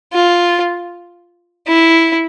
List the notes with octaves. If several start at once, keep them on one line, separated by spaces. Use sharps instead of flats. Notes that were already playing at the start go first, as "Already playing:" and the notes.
F4
E4